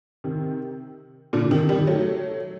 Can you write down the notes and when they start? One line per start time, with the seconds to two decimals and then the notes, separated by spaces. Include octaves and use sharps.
0.24 C3 D#3
1.33 A#2 D3
1.51 C3 D#3
1.69 D#3 G3
1.87 F#3 A3